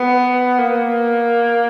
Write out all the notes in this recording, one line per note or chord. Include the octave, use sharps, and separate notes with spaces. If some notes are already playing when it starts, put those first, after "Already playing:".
Already playing: B3
A#3